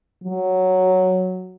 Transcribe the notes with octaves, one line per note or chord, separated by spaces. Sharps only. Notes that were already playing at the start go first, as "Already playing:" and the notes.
F#3